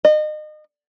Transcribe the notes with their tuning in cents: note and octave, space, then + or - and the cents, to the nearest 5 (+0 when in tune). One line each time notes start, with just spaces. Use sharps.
D#5 -30